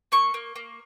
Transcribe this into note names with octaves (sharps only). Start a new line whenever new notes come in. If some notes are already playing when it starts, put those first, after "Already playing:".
A#3 C#6
A#3
A#3